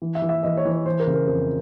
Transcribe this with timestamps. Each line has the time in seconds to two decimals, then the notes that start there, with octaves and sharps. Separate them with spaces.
0.02 E3
0.15 E5
0.22 E3
0.29 E5
0.43 E3 D#5
0.57 C#5
0.65 E3
0.72 C#5
0.86 E3 C5
1.00 A#4
1.07 C#3
1.14 A#4
1.28 F2 A#4